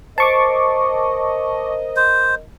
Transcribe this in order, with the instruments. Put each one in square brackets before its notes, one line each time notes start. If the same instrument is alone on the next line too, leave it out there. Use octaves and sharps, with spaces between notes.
[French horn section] A#4 D#5 [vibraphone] C5 [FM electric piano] A5 C#6 D6
[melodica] C5